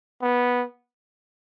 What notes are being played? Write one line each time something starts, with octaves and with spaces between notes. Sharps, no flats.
B3